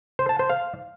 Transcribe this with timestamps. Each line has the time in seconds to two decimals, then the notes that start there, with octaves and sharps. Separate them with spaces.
0.19 C5
0.29 A5
0.39 C5
0.50 F5